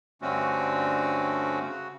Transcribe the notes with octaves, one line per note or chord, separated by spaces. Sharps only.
G2 D3 A3 C4 C#4 F#4
C#3 F#4